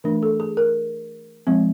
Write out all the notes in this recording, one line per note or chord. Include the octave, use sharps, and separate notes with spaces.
E3 A3 D4 A#4
A4
G#4
A#4
F3 G#3 C4